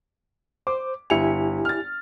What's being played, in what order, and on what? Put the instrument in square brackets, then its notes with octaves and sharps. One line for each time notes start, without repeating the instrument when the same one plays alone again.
[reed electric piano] C5 [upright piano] D6
[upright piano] G1 C#7 F7 [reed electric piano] E4 G4 G#5
[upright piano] F6 A6